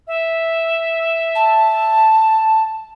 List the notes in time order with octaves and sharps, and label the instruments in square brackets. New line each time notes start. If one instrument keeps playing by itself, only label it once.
[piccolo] E5
[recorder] A5